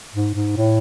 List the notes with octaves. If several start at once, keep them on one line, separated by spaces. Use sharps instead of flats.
G#2
G#2
A2